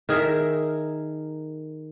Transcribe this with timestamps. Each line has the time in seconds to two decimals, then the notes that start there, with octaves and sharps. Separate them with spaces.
0.09 D#3 G#4 A#4 E5